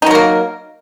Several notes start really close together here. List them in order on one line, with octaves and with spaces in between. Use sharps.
D#4 F#3 A#4 A#3